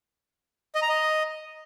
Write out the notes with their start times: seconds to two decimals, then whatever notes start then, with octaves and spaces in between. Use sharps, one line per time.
0.75 D#5
0.82 A#5
0.89 D#5